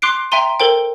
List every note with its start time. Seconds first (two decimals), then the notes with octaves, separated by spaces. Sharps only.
0.02 C6 D6 F#6 C7 D7
0.32 E5 G5 A#5 C6 D#7
0.60 A4 A#4 C5 G5